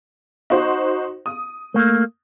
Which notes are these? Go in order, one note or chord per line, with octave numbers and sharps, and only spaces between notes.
D#4 F#4 C5
D#6
A3 A#3